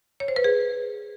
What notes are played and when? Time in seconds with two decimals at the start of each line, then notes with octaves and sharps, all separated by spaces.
0.20 C#5
0.28 C5
0.36 B4
0.44 G#4